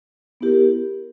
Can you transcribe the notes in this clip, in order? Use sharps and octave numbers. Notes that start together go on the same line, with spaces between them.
B3 E4 G4 A#4